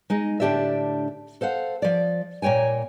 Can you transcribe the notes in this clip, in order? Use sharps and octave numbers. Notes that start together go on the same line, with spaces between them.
G#3 D#4
A2 D3 D4 G4 D5 E5
A4 C5 F5 F#5
F3 D5
A#2 A#3 C#5 G5 G#5